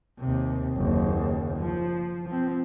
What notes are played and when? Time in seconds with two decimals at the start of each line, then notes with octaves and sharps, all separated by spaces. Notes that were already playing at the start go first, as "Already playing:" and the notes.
0.19 D#2 C3
0.77 F#1 D#2
1.59 F3
2.26 F3 C4